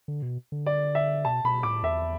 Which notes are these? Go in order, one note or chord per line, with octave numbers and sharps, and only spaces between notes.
D3
B2
D3
D5
E5
B2 A5
B2 B5
A2 D6
E2 E5